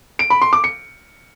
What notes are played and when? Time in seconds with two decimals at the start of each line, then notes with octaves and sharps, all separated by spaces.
0.19 D7
0.30 B5
0.42 C6
0.53 D6
0.64 C#7